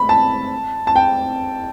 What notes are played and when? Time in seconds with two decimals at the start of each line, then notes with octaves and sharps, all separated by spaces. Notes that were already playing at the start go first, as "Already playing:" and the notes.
Already playing: B5
0.09 A5
0.87 A5
0.96 G5